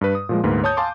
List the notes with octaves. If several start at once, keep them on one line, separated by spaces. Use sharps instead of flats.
G2 B4
D#6
A#2 F3 G#3
D2 G#2 A#3 B4
C#5 A5 D#6 G6
F5 G#5 A5 C6 D6